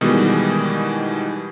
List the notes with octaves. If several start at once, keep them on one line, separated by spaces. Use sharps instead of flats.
B2 D#3 E3 G3 G#3